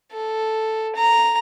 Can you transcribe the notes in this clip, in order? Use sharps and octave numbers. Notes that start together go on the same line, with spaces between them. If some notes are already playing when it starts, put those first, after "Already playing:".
A4
A#5